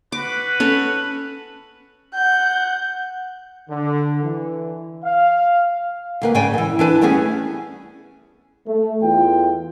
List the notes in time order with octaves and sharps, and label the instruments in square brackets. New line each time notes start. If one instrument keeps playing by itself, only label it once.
[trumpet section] F#4 B4 [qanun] D6
[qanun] C#4 A4
[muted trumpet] F#5 [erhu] G6
[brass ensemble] D3
E3
F5
[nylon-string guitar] D2 A#3 B4
G#2 C#3 C#5 D5 G5 G#5
D#3 E3
E3 D4 B4
G3 A3 B3 C#4 G#4
[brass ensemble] A3
E2 F4 G5